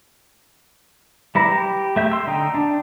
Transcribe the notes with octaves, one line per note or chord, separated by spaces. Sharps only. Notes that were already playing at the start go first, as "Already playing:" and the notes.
G3 E4 B4 A#5
G4
A3 E5 G6
C6 E6
D3 D#4 G5
D4